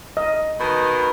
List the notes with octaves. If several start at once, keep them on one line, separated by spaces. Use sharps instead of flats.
D#5
B2 D#3